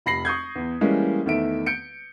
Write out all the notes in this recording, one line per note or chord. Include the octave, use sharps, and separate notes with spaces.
F1 B5 A#6 C7 F#7
C#6 D#6 G6 G#6
E2
E3 G3 G#3 A#3 C#4
E2 D#3 A3 E5 D7
G6 C#7 D7